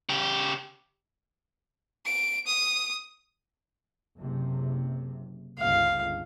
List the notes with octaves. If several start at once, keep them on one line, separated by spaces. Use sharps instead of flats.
C#3 G4
D7
D#6
F#1 C3
G1 C#2 F5